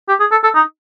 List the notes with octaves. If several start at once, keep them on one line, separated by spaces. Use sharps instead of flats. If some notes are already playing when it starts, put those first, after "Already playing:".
G4
G#4
A4
A4
D#4